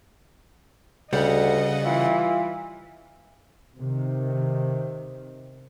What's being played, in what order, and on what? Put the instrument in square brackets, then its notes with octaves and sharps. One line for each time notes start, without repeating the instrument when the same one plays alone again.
[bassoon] D2 [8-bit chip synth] C#3 F#5 [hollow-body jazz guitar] G3 [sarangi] D#5
[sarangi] E3 [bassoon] F4
[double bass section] C3 D#3